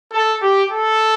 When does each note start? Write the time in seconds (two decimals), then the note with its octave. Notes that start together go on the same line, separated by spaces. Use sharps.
0.13 A4
0.42 G4
0.71 A4